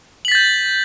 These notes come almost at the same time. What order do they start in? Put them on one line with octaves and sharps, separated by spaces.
F#7 B6 A6 G6